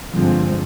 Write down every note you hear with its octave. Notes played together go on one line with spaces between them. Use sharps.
G2 D3 F3 G#3 C4